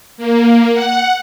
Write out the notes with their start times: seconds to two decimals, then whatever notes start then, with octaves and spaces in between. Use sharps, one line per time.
0.17 A#3
0.73 F#5